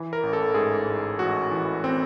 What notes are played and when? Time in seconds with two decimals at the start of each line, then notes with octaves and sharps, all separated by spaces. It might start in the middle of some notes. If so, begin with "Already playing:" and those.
Already playing: E3
0.13 A#4
0.23 A1
0.33 A4
0.54 G#2 G#4
0.87 G#2
1.19 A1 F#4
1.51 E3
1.84 C4